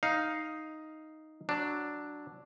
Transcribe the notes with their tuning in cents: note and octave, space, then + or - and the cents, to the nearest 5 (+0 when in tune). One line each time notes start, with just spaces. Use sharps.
D#4 +0 F5 +0
F#3 +0 D4 +0